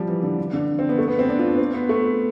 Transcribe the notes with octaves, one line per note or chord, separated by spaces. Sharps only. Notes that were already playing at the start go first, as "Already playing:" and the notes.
Already playing: F3 G3
E3
D3
D3
D3
C4
B3
A3
B3
C4
D4
F4
D4
C4
B3
A3